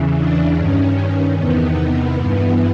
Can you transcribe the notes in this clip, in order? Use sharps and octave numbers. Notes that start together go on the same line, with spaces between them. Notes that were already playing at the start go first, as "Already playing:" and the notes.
Already playing: E2 C#3 E3
D4
G2 D#3 C#4
E2 C3 D#3 B3
G2 E3